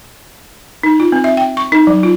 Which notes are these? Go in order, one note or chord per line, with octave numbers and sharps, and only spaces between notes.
D#4
F4
C4
E5
G5
C#6
D#4
F#3
F4